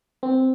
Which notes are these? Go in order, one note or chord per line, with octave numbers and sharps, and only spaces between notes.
C4